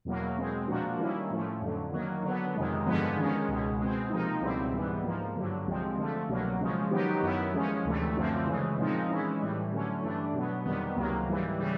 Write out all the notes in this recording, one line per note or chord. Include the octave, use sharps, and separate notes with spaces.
E2 B2 F#3 A#3
B2 G#3 C4
A#2 F3 A#3 D4 F#4
D#3 G3 A#3 C#4 E4
A2 F3 A3 C#4
F2 D3 F#3
D#3 F#3 A#3
D3 F#3 B3
F2 C3 D#3 G#3
G2 D3 F3 G#3 B3
D#3 G#3 C#4
C#2 B2 G#3
B2 G#3 C4
C3 F3 A#3 D#4
C#2 B2 G3 C4 E4
G#2 E3 G3 B3
G#2 F3 A#3
G2 D3 F#3
C2 C3 F3 G#3 C4
D3 F3 A3
C2 B2 F#3 A#3
C#3 F3 G#3 C#4
D#3 F#3 B3 D#4 G4
F#2 D#3 F#3 B3 E4
F3 G#3 C#4
D2 C3 E3 A3
F#2 D3 F3 A3 C4
C#3 E3 G#3
A#2 F3 G#3 C4 D#4
E3 G#3 C#4 E4
A2 E3 G3
D3 F#3 A3 C#4
G2 E3 A3 D4
B2 F#3 B3
F2 C3 D#3 G3 B3
C#2 C3 D#3 F#3 A#3
G#2 E3 G3
C#3 E3 G3